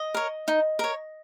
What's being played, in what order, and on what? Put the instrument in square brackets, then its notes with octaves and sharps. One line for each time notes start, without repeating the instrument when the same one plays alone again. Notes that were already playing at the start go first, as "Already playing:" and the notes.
Already playing: [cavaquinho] D#5
A#4 C#5
D#4
A#4 C#5